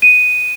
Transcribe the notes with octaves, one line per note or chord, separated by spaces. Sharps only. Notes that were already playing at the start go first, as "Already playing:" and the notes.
D#7